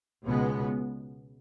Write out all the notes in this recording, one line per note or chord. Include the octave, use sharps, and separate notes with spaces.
C#2 B2 G#3 B3